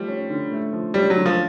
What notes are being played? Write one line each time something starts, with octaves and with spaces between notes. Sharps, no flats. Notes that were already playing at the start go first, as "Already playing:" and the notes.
Already playing: F3 G3 A3
C#4
D3
A3
F3
G3 C#4
F#3
D3
F3